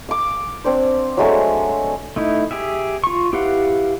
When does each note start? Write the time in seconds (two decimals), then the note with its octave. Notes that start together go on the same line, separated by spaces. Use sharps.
0.09 F5 D6
0.64 C4 D4 C5
1.17 F#3 G#3 A3 D4
2.16 A3 D#4 E4
2.51 G4 G#4 E5
3.04 F4 C#6
3.33 E4 G4 B4 F5 F#5